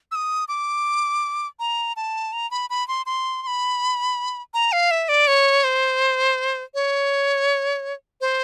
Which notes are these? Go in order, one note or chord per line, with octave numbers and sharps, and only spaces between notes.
E6
D#6
D6
A#5
A5
A#5
B5
B5
C6
C6
C6
B5
A#5
F5
E5
D5
C#5
C5
C#5
C5